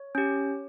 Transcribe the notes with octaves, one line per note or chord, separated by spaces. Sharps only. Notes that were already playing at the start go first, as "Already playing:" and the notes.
Already playing: C#5
C#4 G4